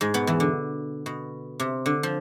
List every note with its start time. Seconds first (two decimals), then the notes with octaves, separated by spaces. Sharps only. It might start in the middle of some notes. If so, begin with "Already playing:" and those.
0.01 G#2 G#3
0.14 B2 B3
0.27 E2 E3
0.40 D3
1.06 B2
1.60 C3
1.86 D3
2.03 F3